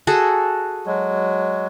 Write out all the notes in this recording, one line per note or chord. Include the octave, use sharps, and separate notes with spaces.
F#4 G#4 A4
F#3 G#3